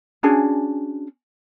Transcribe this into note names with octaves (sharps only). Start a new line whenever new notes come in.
C#4 D4 F#4 G#4